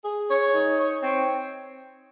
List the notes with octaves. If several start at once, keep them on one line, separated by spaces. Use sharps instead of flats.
G#4
C#5
D#4
C#5
C4